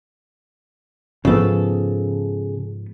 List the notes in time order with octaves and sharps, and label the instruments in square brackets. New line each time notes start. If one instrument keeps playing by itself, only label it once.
[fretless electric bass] G#2 F3 B3 [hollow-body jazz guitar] C#3 A4